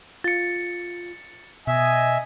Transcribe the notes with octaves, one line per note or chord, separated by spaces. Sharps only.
F4 A6 C#7
B2 D#5 E5 G#5